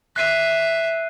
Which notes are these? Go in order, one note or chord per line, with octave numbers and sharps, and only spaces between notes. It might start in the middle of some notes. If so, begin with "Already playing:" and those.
E5 F#6 C7 D#7